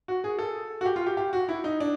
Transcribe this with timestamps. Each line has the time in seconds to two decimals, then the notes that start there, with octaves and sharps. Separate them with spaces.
0.08 F#4
0.24 G#4
0.39 A4
0.81 F#4
0.86 G4
0.96 F4
1.06 G4
1.17 G4
1.33 F#4
1.49 E4
1.64 D#4
1.80 D4